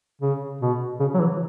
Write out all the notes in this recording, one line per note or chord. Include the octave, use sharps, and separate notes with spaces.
C#3
B2
C#3
F#3
E3